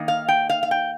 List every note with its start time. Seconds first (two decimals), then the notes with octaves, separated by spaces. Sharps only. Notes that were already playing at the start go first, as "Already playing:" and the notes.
Already playing: D#3 A#3 D#4
0.08 F5
0.28 G5
0.50 F5
0.63 F5
0.71 G5